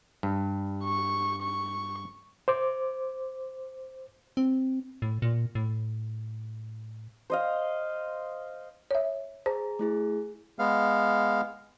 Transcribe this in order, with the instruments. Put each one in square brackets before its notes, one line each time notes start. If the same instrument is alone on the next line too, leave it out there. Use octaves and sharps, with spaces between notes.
[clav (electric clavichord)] G2
[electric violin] C#6
C#6
[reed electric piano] C5 D6
[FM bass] C4
A2
A#2
A2
[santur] C5 D#5 F5
[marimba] C#5 E5
[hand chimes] G#4 A#5 [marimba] C5
[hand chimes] A3 E4 G#4
[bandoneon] G#3 B3 F5